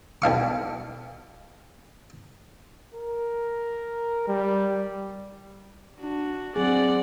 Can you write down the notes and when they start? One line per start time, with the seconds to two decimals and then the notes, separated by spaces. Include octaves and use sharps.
0.22 B1 D4 F5 C#6
2.95 A#4
4.27 G3
5.99 D4 F#4
6.56 F#3 C4 G#4 D5 F#5